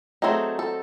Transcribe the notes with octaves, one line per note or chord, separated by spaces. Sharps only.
F#3 A3 C4 D#4 G#4
A4